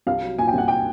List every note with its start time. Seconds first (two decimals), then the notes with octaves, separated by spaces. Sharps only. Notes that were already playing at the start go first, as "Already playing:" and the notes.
0.07 C2 F5
0.22 F#3
0.38 A#2 G#5
0.48 G5
0.54 C2 F#5
0.68 G5